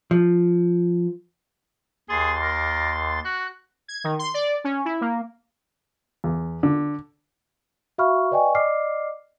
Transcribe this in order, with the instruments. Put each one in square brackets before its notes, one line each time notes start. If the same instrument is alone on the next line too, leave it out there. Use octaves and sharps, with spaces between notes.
[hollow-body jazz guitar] F3
[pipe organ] D#2 C6 A6 [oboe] G#4
[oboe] A#4
[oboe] F#4 [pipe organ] F#6
[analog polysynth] G#6
D#3
C6
D5
C#4
E4
A#3
[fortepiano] E2
D3
[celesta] F#4 E5 F5 B5 C#6 F6
B4 D5 D#5 G5 G#5 C#6
D5 D#5 D6 F6 C7